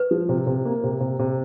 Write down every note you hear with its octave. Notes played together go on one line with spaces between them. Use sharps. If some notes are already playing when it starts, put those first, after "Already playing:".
Already playing: B4
F3
C3
C3
A#3
C3
C3
C3